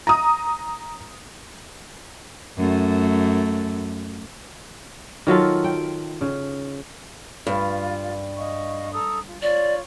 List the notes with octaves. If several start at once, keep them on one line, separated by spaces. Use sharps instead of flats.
A#5 D#6
F#2 A3
D#3 F#3 F4 A4
G5
C#3
G2 F4
D#5 F5 C#6
A4 A#5 D#6
F4
F4 C#5 D5 C#6